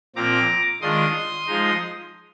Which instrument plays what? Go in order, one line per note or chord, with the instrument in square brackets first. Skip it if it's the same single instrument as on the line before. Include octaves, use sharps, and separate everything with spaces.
[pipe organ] A#2 F3 C4 A#5 D6
D#3 G#3 D4 F4 C6 D#6
F3 G#3 D#4